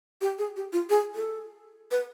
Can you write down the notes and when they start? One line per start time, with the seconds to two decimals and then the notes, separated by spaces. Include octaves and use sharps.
0.21 G4
0.39 G#4
0.56 G4
0.73 F4
0.90 G#4
1.15 A4
1.91 B4